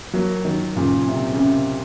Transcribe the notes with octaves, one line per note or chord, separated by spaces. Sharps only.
F#3 A#3
D#3 F#3
A#2 C#3
C3
C#3
C3